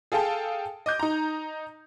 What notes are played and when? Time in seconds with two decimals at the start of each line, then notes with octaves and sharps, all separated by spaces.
0.12 G#4 A4 F5 G5 A5
0.86 D#5 D6 G6
0.99 D#4 A#5